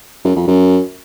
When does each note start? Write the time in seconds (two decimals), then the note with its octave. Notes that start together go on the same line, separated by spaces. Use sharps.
0.25 F#2
0.36 F2
0.47 F#2